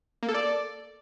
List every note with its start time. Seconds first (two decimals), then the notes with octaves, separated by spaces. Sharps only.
0.23 A#3
0.29 A4
0.34 D5